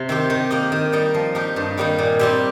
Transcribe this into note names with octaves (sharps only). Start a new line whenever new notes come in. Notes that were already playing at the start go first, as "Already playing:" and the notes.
Already playing: C3
D#3 C4 G4
D#3
A#3 G4 D#5
D#3
G3 D#4 A#4 D#5
F3
D#4 G4 A#4 D#5
G2
D#3 G3 A#3 D#4
A#2
G3 C4 G4